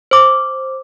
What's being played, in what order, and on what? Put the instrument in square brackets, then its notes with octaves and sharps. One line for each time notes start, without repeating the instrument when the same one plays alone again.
[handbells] C5 D6